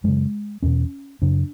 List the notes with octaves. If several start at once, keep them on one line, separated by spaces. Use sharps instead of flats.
F#2 C#3 G#3
E2 B2 C#4
F#2 C#3 D4